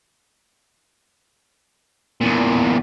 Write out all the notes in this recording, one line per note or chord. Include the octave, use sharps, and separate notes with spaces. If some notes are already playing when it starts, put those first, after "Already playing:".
E2 A#2